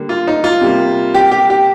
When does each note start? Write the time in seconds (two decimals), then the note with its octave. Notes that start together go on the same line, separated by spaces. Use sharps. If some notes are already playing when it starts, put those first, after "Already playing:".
Already playing: D3 G3 A#3
0.09 F4
0.28 D#4
0.44 F4
0.61 C3 G3 A#3
1.14 G4
1.31 G4
1.50 G4